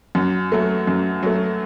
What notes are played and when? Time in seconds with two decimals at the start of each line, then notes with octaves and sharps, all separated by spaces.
0.15 F#2
0.52 F#3 A3
0.87 F#2
1.23 F#3 A3